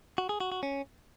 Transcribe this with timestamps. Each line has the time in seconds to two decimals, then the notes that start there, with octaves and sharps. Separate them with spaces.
0.18 F#4
0.29 G#4
0.40 F#4
0.52 F#4
0.63 C#4